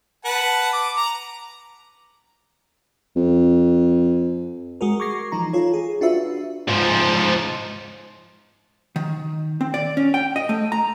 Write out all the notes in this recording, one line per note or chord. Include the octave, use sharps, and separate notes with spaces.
B4 F#5 A5
D6
A#5
F2
G#3 F#4 G#4 A#4
C#6 D6 G#6 A#6 C7
E3 F3 D#4 A#5
F4 A4 C#5
G#4
D4 F4 F#4 B4 E5
G#2 F3
D#3
C4
D5
C#4
G5
D#5
A3
A#5